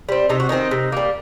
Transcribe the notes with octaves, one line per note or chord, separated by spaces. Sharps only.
G3 C4
C3 D#4
F#4
D#3 A3 C4 D#4
C3
G3 A#3